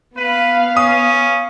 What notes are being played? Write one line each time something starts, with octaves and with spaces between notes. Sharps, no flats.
B3 B4 F5
C#4 D#6